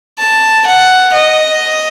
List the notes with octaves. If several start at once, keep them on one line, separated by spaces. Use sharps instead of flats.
A5
F#5
D#5